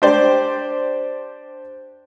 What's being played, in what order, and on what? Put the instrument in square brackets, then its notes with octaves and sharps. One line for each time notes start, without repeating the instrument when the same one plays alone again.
[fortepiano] D4 G4 C5 D5